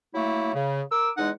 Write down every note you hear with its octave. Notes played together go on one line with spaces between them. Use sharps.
F#3 A3 A#3 E4
C#3
A#4 D6 E6
E2 G#3 D#4 F#5